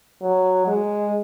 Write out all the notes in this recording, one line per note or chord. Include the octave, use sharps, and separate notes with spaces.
F#3
G#3